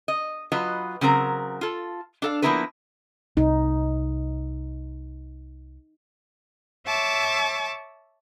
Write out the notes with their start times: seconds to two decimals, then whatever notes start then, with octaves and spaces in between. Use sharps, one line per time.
0.08 D#5
0.52 F#3 F4 B4 D#5
1.01 C#3 F#3 C4 A#4 A#5
1.61 F4 A4
2.22 D4 A4 F5
2.42 F3 A#3 B3 E4 A#4 B4
3.37 C2 D#4
6.87 C#5 E5 A5 D6